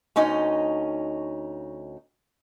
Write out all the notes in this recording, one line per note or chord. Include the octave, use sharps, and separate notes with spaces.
D2 C#4 D#4 D#5